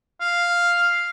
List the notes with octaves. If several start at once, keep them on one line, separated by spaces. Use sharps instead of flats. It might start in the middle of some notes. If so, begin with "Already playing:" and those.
F5